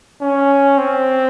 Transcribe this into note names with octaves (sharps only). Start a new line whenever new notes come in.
C#4
C4